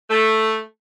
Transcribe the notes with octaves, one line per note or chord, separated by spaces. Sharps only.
A3